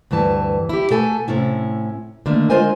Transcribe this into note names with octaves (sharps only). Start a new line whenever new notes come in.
D2 G2 E3 A5
E4 G4
B2 A3 A4 G#5
A2 C3 C#4 E4
D3 D#3 A3 A#3
G#3 F4 A#4 C5 D#5 G#5